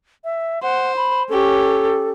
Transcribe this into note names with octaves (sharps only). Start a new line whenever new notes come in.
E5
C5 F#5
B5
C#4 G4 A4